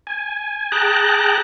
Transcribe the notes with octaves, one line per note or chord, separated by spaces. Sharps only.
G#5
G#4 G5 A5 A#5 F#6